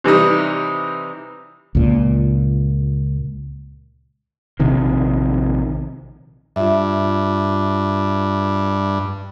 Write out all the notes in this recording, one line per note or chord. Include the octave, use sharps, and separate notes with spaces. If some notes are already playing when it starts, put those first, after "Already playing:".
C3 E3 G3 D#4
C#2 A#2
A#1 C3 D#3
G2 F4 E5